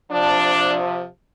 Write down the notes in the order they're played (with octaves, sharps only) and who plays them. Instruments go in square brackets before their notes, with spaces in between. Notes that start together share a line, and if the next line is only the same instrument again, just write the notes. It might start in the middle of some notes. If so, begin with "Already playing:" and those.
[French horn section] C3 F3 D4